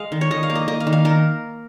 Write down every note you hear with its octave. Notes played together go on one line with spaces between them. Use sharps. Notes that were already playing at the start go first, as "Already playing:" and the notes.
Already playing: G#3 D#5 F5
D#3
C#5
D#3 D#5
F5
A#3
D#5
A#3 D#5
F5
D#3
F5
D#3 A#4